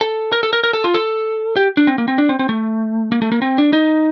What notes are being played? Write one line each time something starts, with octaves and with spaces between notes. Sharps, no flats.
A4
A#4
A4
A#4
A#4
A4
F4
A4
G4
D4
C4
A#3
C4
D4
C4
C4
A3
A#3
A3
A#3
C4
D4
D#4